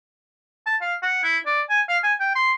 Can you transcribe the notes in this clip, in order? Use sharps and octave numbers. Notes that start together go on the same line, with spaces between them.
A5
F5
F#5
E4
D5
G#5
F5
G#5
G5
C6